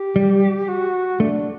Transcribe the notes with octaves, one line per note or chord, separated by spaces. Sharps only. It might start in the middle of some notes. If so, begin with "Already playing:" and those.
Already playing: G4
G3
F#4
A3 D4